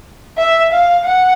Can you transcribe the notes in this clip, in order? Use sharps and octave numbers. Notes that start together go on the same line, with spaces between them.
E5
F5
F#5